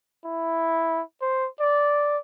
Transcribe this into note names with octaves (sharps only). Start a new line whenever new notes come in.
E4
C5
D5